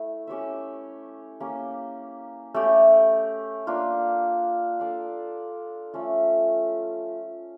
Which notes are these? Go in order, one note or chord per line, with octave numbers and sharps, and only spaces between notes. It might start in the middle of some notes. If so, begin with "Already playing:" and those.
Already playing: A3 E4
C#4 G4 C#5 E5
A#3 C#4 G4
A3 C#4 G4
A#3 D4 F4
D4 A4 D5 F5
F3 A3 C#4 F4